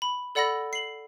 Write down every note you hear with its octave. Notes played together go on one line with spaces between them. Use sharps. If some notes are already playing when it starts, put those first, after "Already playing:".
B5
A4 D5 F#5 B5 E6 A#6
C7 F#7